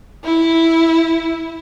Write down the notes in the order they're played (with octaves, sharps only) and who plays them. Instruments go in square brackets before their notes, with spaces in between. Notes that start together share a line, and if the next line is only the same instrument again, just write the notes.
[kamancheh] E4